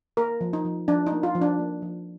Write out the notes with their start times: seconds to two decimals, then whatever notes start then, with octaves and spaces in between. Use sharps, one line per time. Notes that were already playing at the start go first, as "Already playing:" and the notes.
0.17 A#3 A#4
0.41 F3
0.53 D#4
0.65 F3
0.88 F3 D4
1.07 D#4
1.12 A#3
1.23 F4
1.35 F3
1.41 D4
1.59 A#3
1.82 F3